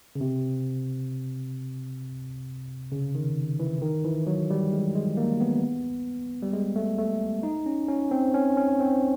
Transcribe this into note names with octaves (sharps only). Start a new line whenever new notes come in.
C#3
C3
C#3
D#3
E3
D#3
E3
F#3
G3
G#3
G#3
A#3
B3
G3
G#3
A3
A3
D#4
C#4
C#4
C4
C#4
C#4
C4